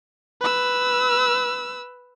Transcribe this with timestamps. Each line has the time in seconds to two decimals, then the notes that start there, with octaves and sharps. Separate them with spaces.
0.41 B4 E6